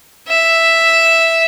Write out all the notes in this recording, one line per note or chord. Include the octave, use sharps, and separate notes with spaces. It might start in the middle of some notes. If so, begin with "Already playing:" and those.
E5